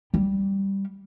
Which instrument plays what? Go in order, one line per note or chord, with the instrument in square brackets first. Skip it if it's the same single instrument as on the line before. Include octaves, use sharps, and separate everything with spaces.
[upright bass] G3